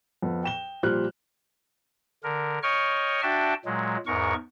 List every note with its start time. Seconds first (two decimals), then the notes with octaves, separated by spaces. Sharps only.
0.22 F2 B3
0.44 G5 E7 G7
0.83 A#2 F3 G3 C5 F6 F#6
2.24 D3 A#4
2.63 C#5 D#5 G5 C#6 F6
3.23 D4 F#4 E5 G5 A5
3.65 A#2 F#3 G#3
4.06 E2 G#2 A#4 C#6